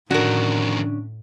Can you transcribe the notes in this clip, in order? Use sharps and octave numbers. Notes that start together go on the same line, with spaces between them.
F2 A2 D3 D#3 C#4 D4 F#4 A#4